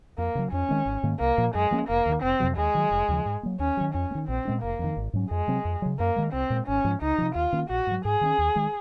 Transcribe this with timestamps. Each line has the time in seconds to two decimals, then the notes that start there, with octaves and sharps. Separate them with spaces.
0.18 F2 A#3
0.35 C#3 F#3
0.52 F2 C#4
0.69 D#3 G#3 C4
0.86 G#1
1.03 G#2 D#3 A#3
1.20 C2 A#3
1.38 A#2 F3
1.55 F#2 G#3
1.71 F3 A#3 C#4
1.88 F1 A#3
2.06 D#2 D#3
2.22 F1 C4
2.40 F2 C3 F#3
2.57 D#2 G#3
2.75 D#3 F#3
2.91 F1
3.08 D#2 C#3 F3
3.25 G#2
3.43 F#3 A#3
3.59 D#2 C#4
3.77 D#3 F#3
3.94 F2 C#4
4.11 A#3
4.15 D#3
4.28 A#1 C4
4.45 A#2 G#3 C#4
4.62 F1 A#3
4.79 F2 D#3
4.97 G#1
5.13 G#2 F#3 C#4
5.31 F2 G#3
5.48 C3 F#3 C4
5.65 F2
5.82 C#3 F#3
5.99 F#2 A#3
6.16 D#3 G#3
6.33 C2 C4
6.50 A#2 G#3
6.67 G#1 C#4
6.85 G#2 F3
7.01 C#2 D#4
7.18 C3 F3
7.35 D#2 F4
7.53 D#3 A#3 C#4
7.70 A#1 F#4
7.87 G#2 F#3
8.05 G#2 G#4
8.21 D#3 A#3
8.25 C#4
8.38 D#2
8.56 D#3 G#3